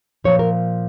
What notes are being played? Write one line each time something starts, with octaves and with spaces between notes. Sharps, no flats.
A#2 F3 C#5
A#4